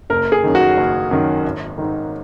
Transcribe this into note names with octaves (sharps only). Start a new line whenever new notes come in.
F#1 A#4
G#4
F#2 D#3
F#4
F#1
F#2 D#3
G#1
G#2 D#3